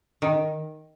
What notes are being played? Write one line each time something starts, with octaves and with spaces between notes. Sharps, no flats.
D#3